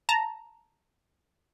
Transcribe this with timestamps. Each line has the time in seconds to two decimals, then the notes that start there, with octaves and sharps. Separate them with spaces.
0.09 A5 A#5